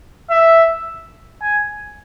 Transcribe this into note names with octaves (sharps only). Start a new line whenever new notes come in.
E5
G#5